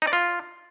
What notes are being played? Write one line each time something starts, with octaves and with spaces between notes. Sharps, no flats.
D#4
D5
F4